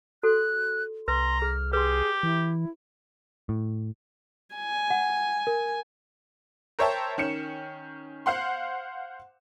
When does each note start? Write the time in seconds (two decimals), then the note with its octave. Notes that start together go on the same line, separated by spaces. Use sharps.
0.23 F#4 A4 C6 F#6
1.08 C2 B4 A#5 C6
1.42 G#4 F6
1.73 G4 G#4 B4 C6
2.23 E3 E4
3.49 A2
4.55 G#5
4.90 F#5
5.47 A#4
6.79 A#4 C5 C#5 E5 G5 A5
7.18 D#3 C#4 C#7 E7
8.26 C5 F5 F#5 C6